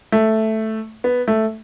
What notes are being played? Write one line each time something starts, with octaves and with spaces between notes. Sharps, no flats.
A3
B3
A3